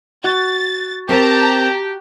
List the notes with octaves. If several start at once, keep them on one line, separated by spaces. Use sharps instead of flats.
F#4 A6
C4 G4 A#4 C5 A5 A#5